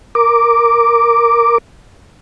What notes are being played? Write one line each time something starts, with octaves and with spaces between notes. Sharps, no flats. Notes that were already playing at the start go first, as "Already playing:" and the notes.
A#4 D6